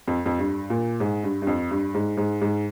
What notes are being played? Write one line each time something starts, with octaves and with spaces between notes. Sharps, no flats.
F2
F2
G2
A#2
G#2
G2
G2
F2
G2
G#2
G#2
G#2